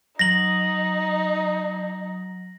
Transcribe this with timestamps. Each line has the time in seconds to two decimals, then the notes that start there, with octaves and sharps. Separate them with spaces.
0.19 F#3 D#4 A#5 A#6 F#7